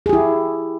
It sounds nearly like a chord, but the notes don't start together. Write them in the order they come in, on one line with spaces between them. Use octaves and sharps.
G#4 G4 E4